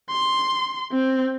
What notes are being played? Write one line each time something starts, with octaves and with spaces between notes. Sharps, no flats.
C6
C4